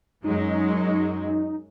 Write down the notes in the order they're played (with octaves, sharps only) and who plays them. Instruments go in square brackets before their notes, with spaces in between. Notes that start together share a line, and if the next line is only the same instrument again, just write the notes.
[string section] F#2 F#3 G#3 [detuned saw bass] D#4